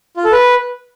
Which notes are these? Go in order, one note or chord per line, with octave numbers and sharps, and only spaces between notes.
F4
A4
B4